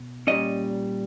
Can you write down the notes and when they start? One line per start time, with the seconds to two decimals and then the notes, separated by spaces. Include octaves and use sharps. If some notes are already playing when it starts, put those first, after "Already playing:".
Already playing: B2
0.27 A#2 G3 C#4 D#5